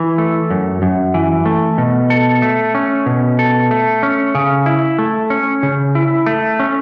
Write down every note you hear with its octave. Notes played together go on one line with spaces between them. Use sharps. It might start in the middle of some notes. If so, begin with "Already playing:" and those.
Already playing: E3
A3
F#2
F#2
E3
A3
B2
A4
A3
C#4
B2
A4
A3
C#4
C#3
E4
A3
C#4
C#3
E4
A3
C#4